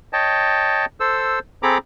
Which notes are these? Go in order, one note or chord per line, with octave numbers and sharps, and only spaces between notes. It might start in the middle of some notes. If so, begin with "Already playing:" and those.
C#5 D#5 G5 A5
A4 C5 E6
C4 G#4 A4 A#5 B5 D6